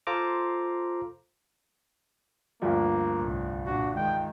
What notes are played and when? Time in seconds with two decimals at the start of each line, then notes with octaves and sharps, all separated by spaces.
0.07 F4 A4 C5 A#5 D6
2.62 D2 G2 F3 A#3
3.17 C2 A2
3.66 A#2 D4 F#4
3.96 D#3 G#3 G5